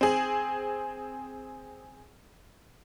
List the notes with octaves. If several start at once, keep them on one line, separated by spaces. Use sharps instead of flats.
C4 G#4